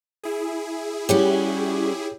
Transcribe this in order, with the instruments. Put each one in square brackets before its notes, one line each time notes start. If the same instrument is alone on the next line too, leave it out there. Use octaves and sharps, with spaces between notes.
[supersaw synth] E4 G#4
[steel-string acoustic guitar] G3 C#4 F#4 [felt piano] G4 C#5